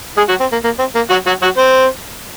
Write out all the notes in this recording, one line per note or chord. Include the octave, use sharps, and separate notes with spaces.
G#3 G#4
F#3 F#4
C4
A#3
A#3
C4
A#3
F#3 F#4
F#3 F#4
F#3 F#4
C4 C5